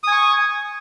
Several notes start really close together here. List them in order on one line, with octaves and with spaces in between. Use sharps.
D#6 G#5 C#6